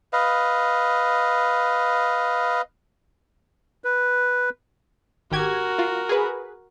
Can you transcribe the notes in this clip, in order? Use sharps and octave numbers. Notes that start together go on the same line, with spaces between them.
B4 D#5 F5
B4
G#1 F#4 G4 A#4 G#6
F4
G#4 B4